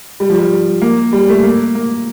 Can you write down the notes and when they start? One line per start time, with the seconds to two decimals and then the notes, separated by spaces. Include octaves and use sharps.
0.20 G3
0.30 F3
0.39 G3
0.82 A#3
1.13 G3
1.29 A3
1.43 A#3
1.75 A#3